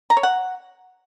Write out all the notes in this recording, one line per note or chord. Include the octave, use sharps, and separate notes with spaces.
A#5
C#5
F#5